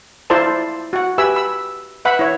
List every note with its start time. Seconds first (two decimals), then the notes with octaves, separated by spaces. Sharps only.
0.30 E4 F4 A4 C5 D5 A5
0.93 F#4 F#5
1.18 G4 B4 E5 G#5 B5 E6
1.36 B5 E6
2.05 B4 E5 F#5 B5
2.19 E4 C#5